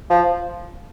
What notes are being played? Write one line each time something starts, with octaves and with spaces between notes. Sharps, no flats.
F3